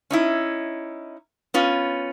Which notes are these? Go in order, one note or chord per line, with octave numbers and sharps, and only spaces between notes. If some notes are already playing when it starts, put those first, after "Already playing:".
C#4 D#4 E4
B3 C#4 F4